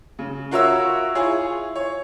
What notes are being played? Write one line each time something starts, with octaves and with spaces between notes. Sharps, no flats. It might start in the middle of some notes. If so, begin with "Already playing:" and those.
C#3
F4 F#4 A#4 C#5 E5 E6
E4 F4 G#4 C#5
C#5